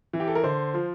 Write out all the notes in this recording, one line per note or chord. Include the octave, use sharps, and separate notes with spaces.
E3
G4
A4
A#4
D3 C5
F3